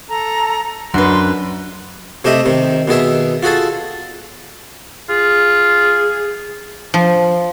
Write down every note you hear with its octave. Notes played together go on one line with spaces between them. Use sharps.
A4 A#5
F#2 F#3 C#4 D4 F#4 B4 C6
C3 A3 G4 D#5 E5
C3 D#3
B2 D#3 G#4 E5
F4 F#4 G#4 A4
F4 G#4
F3